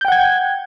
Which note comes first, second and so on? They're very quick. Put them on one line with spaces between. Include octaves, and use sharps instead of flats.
G6 G5 F#5 G#6